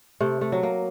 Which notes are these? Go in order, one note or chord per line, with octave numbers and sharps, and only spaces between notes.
C3 A3
A3
F#3
A#3